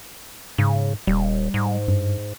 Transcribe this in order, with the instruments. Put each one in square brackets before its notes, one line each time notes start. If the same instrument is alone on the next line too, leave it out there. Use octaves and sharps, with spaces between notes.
[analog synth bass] G#2 [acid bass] C#3
[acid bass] D#1 [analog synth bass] G3
[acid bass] G#2
[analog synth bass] G2